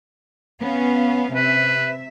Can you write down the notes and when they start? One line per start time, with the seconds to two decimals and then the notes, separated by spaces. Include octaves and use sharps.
0.60 B3 C#4 F5
1.35 C3 B4 E5